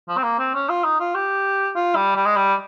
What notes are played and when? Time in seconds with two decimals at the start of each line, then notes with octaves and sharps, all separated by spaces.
0.09 F3
0.17 C4
0.23 A#3
0.39 C4
0.54 C#4
0.69 F4
0.84 D#4
1.00 F4
1.14 G4
1.75 F4
1.95 G3
2.16 G3
2.26 G#3
2.36 G3